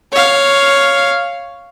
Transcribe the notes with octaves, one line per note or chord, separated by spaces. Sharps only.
C#5 F5